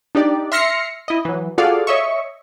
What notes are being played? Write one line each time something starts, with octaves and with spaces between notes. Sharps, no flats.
D4 D#4 G4 D5
E5 C6 F6 A#6 C7 C#7
E4 D#5
E3 F#3
F4 F#4 G#4 A4 D5 F5
C#5 D#5 E5 C#6